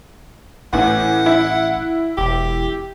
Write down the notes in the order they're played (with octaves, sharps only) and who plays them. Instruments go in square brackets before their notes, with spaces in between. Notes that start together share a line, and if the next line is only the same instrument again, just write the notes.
[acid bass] A1 [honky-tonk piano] A2 E3 [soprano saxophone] F#5
[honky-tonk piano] E4
[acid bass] E1 [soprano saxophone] G4